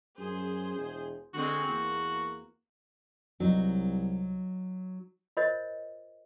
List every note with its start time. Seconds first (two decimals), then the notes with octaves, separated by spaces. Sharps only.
0.18 F#2 G#4 C5
0.77 E1
1.34 D3 G#3 C4 F#4 G#4
1.67 E2 A#3
3.40 C2 F#3 D#4
5.37 F4 A#4 C5 C#5 D#5